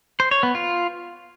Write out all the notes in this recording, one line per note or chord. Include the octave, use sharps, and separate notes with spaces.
C5
C#5
B3
F4